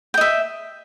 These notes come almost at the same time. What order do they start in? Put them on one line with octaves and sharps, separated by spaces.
G5 D#5 E5